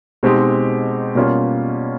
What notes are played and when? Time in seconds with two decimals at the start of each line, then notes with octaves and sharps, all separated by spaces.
0.23 B2 G#3 C4 D#4 G4
1.15 B2 G3 A#3 C#4 F4